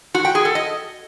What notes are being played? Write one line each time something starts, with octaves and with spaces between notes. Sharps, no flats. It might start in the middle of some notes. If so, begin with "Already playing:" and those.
F#4
G5
G#4
A4
D#5